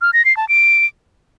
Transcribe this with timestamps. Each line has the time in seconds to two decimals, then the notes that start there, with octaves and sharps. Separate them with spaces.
0.02 F6
0.13 A#6
0.25 C7
0.37 A5
0.49 D7